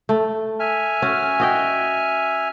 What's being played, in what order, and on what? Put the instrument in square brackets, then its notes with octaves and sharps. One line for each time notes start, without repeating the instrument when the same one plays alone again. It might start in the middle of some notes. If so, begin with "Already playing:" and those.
[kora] A3
[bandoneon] E5 G#5 F6
[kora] C#4 F#4
F#4 D#5 G5